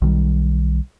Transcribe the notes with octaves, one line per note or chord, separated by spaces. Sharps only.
B1 D#3 G3